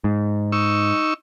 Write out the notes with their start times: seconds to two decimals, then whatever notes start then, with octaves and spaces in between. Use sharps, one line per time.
0.04 G#2
0.52 D#4 C#6 E6